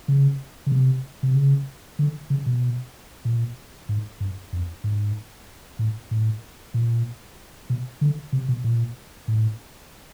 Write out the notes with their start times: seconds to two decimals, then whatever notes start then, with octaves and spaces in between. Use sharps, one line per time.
0.08 C#3
0.66 C#3
0.72 C3
1.23 C3
1.35 C#3
1.99 D3
2.30 C#3
2.46 B2
3.25 A#2
3.89 G#2
4.20 G2
4.53 F2
4.84 G#2
5.79 A2
6.11 A2
6.74 A#2
7.70 B2
8.01 D3
8.33 C3
8.48 B2
8.64 A#2
9.28 A2